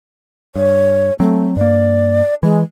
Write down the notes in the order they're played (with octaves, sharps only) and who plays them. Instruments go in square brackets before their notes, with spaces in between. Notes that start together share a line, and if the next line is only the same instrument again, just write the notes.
[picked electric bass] G2 [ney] C#5
[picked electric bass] F#3 C4 [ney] A3
[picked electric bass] G2 A#3 [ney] D5
[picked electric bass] E3 [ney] G#3